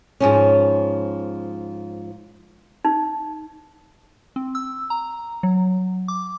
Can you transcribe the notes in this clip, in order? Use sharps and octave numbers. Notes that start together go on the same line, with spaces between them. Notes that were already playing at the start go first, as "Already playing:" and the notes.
G#2 F3 C#4
D#4
C4
E6
A#5
F#3
D6